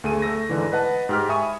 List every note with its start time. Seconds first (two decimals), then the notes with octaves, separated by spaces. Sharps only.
0.04 D2 A3 G#4 D#7
0.22 A3 E6 A#6
0.49 G#2 D3 E3
0.72 B4 D#5 F#5 A5
1.09 G#2 G4 F6
1.29 E5 G#5 B5 C#6 D#6